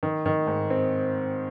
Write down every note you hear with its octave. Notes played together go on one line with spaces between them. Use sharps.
D#3
D#3
G#2
C4